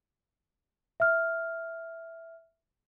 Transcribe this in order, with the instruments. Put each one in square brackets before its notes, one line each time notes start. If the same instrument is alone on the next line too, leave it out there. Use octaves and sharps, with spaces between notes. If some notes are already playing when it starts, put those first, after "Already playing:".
[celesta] E5 F6